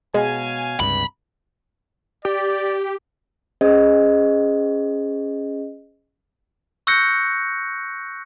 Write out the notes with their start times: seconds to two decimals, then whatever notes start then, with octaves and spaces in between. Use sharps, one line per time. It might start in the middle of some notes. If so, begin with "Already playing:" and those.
0.14 B2 G#3 C#5 F5 G#5
0.80 C#2 G2 C3 B5
2.25 G4 D5
3.61 C#4 G#4 C5 D#5
6.87 C#6 E6 F#6 G6 A#6 C#7